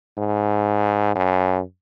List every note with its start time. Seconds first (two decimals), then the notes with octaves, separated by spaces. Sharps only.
0.18 G#2
1.15 F#2